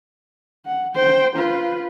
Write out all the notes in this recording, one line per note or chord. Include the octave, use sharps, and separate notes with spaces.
F#5
C5 G5
F4 B4